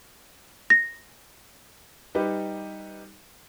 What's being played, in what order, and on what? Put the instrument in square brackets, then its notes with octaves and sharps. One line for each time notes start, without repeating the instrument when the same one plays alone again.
[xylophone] A#6
[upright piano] G3 D#4 G4 B4